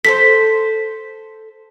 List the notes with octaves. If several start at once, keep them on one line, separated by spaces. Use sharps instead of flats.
A4 A#4 C5 B6